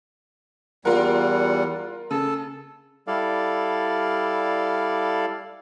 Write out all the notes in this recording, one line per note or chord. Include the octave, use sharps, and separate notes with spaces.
E2 G3 F4 A#4 F#5
C#3 A4
G3 E4 A4 D5 F5